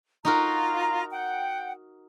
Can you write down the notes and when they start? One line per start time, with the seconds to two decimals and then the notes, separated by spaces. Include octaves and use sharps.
0.25 D#4 F4 F#4 A#4 A#5
1.12 F#5 G5